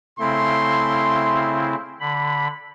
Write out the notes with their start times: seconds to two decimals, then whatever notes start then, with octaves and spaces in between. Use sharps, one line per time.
0.19 C#3 A3 C4 E4 C6
2.00 D3 B5